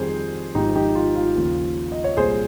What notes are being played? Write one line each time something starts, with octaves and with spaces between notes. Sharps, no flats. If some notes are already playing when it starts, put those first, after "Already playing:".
Already playing: F2 D#3 G3 G#4 C5
G#1 G#2 F3 D#4 G4
D#4 G4
F4
F4
D#2 C#3 F3
D#5
C#5
C2 A#2 G3 G#4 C5